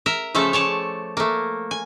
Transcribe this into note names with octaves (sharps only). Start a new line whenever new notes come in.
A#4 E5
C#3 F3 A3 A4 E5 A5
C#5 D5 A5
A3 A#3
G#5